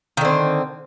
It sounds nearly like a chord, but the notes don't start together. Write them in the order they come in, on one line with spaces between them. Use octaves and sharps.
D#3 D3 C4